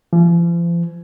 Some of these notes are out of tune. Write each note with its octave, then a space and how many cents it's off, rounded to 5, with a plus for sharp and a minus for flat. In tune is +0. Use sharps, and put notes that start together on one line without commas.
F3 -40